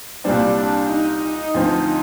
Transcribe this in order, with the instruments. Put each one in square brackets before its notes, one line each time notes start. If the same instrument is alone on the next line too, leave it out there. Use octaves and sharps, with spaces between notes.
[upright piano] C2 A#2 G3 C4 [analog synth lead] D4
[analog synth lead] D4
D#4
[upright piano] D2 D3 F3 C4 F4